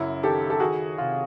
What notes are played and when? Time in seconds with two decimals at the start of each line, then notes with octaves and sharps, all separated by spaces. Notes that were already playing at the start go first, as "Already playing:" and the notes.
Already playing: F#2 C#3 E4
0.23 D#3 G4 A4
0.50 A4
0.60 D#3 F#4 G#4
0.98 C3 F4